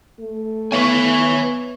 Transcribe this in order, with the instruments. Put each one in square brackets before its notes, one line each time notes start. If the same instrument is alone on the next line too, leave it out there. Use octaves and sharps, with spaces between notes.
[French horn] A3
[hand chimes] B3 C#6 [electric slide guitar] B4 E5 G#5 [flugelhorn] C#5